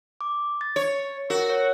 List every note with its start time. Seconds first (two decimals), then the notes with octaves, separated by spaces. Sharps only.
0.21 D6
0.61 A6
0.76 C#5
1.30 F#4 A#4
1.50 C#5